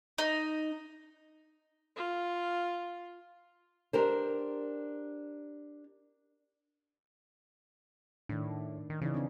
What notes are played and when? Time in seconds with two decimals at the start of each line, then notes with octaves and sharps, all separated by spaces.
0.18 D#4
1.96 F4
3.93 D4 G4 A#4 C5
8.29 A2 D#3 D4
8.90 D#3
9.02 C#3 E3 D#4 D5
9.14 C4 D4